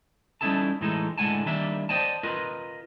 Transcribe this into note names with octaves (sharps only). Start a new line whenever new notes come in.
G3 C#4 D#4 E4 A4 A5
A2 E3 G#3 D#4 A4
A2 D3 G#3 F#5 G#5 A5
D#3 G3 A#3 D4 E5
C5 D5 D#5 G5 A5
F4 A#4 B4 D#5